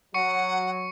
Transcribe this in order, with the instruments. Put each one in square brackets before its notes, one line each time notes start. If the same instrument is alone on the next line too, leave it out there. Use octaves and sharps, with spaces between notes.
[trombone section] F#3 [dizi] F#5 [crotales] C#6 C#7